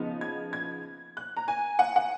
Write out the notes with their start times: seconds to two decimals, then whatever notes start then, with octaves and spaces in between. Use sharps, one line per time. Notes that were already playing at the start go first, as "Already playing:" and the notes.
Already playing: C#3 F3 B3 D#4
0.21 G#6
0.53 G#6
1.17 F#6
1.37 A#5
1.48 G#5
1.79 F#5
1.96 F#5